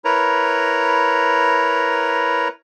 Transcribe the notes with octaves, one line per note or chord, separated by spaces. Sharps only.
E4 A#4 B4 C#5 A#5